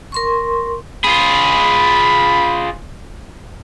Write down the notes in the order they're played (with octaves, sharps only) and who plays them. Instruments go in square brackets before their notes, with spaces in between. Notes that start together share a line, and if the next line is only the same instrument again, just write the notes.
[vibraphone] A#4 C6 C#6
[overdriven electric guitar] F4 G#4 [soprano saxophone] B5